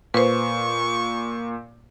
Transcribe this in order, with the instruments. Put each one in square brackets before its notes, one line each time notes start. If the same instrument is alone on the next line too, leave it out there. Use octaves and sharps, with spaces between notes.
[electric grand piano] A#2 [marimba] B4 C5 [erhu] C#6